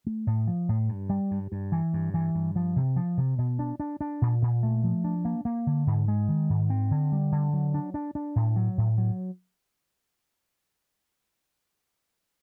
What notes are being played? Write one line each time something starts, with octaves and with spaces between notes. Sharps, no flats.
A3
A2
F3
A2
G2
G3
G2
G2
E3
G2
E3
G2
F3
C3
F3
C3
B2
D4
D4
D4
A#2
A#2
A3
F3
D4
A#3
A#3
D3
G#2
G#3
D#3
G#2
C4
D3
G3
D3
F#3
D4
D4
D4
A2
F#3
A2
F#3